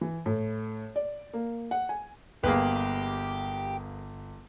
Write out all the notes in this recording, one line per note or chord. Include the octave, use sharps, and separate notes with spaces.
E3
A2
D5
A#3
F#5
G#5
G1 A#3 G4 G#4 B4